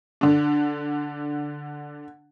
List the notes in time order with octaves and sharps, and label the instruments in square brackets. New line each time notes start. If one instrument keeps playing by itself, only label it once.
[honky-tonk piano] D3 D4